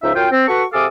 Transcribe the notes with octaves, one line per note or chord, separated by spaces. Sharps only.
C#2 F3 D#4 E5
F#2 F4 G5
C4
F#4 A4 B4 C#6
C3 G#4 A4 F5 D6 D#6